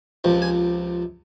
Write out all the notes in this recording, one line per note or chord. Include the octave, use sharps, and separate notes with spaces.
C#2 C3 F3
G#5